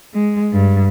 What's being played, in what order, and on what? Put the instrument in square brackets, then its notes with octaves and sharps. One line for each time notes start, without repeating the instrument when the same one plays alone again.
[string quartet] G#3
G2